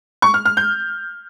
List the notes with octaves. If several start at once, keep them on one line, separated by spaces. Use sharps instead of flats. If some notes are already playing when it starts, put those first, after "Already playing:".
C#6
F6
F6
G6